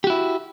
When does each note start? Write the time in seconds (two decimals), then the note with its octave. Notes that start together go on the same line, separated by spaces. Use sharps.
0.04 G4
0.07 F#4
0.10 E4